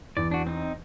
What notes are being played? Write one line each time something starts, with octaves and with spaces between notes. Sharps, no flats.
E2 D5
D4 F#4
C4 D#4